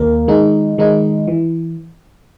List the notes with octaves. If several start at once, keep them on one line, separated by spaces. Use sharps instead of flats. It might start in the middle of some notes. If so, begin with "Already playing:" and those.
Already playing: D#2 A#3 A#4
D#3 G#3 D#4
D#3 G#3 D#4
E3